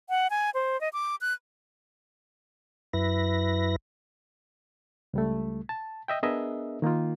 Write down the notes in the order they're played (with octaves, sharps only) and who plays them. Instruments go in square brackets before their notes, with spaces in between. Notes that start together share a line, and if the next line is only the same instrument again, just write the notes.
[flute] F#5
G#5
C5
D#5
D6
F#6
[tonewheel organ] F#2 E4 B4 A#6
[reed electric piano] C#2 G3 A3
A5
D#5 E5 G5
B3 D4 G#4 A#4 D#5 E5
D#3 A#3 D#4 F4